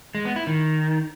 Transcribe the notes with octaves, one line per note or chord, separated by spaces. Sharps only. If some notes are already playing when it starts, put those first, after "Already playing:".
G#3
B3
E4
D#3